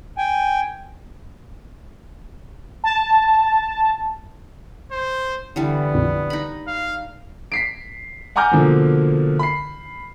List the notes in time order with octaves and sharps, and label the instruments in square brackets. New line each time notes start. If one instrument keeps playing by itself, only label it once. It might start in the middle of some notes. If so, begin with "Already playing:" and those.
[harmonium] G5 G#5
[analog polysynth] A5
[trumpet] C5
[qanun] D3 E3 G3 [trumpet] B3
[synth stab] A#1 F2
[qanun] D#4 B5
[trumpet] F5
[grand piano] B6 C7 D7
F#5 G#5 A#5 D6 F6 G6
B2 D3 F3 A#3
B5 C7